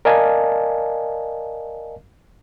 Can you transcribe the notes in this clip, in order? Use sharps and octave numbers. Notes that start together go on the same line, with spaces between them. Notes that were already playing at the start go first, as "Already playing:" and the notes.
A#4 D5 D#5 F5 G#5 A5